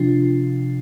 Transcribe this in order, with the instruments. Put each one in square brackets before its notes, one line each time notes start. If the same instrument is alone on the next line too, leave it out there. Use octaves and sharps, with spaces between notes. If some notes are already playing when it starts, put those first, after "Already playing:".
Already playing: [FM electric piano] C3 F3 D4 F4